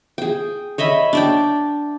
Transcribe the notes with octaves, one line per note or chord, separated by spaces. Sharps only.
G#4 G5
C#5 D#5 E5 B5
D4 D5 G5